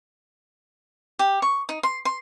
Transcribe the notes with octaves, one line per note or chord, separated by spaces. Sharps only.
G4
C#6
D#4
C6
C6